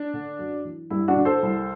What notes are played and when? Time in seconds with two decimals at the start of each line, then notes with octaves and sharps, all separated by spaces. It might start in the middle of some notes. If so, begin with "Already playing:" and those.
Already playing: D4
0.14 D3
0.39 F#2
0.65 E3
0.90 G2 E4
1.08 D4 F#4
1.17 D3
1.25 A4 C5
1.43 C2